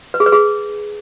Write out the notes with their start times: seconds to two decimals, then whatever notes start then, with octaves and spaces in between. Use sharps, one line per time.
0.14 B4
0.20 G#4
0.26 B4
0.32 G#4